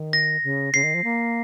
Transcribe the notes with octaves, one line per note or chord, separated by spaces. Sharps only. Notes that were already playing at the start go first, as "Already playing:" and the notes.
Already playing: D#3
A#6
C#3
C#3 C7
D#3
F3
A#3